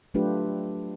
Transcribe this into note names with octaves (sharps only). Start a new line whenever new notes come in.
F#3 A3 D4 F4 G4 B4